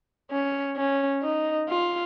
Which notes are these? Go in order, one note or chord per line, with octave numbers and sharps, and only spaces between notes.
C#4
C#4
D#4
F4